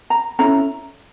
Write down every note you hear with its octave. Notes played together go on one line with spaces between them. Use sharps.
A#5
C#4 E4 A4 A#5